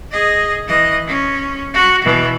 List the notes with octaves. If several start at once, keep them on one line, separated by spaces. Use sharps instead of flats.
G#4 D#5
E3 D#5
C#4
F#4
B2 E3